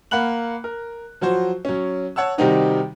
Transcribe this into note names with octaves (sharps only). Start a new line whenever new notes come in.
A#3 F#5 B5 F#6 F#7
A#4
F3 F#3 F#4 C5
F#3 C#4
C#5 F#5 A5 E6
C3 D#3 G3 C4 D#4 F#4